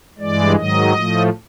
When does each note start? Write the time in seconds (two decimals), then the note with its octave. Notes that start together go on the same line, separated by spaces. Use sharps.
0.18 G2 E3 G#3 D5
0.56 G#2 D#3 F#3 D#5
0.93 A2 F3 A3